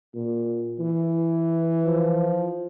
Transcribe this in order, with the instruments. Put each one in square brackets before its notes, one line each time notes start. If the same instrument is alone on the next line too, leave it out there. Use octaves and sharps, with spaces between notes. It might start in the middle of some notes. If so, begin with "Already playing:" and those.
[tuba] A#2
E3
[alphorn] F3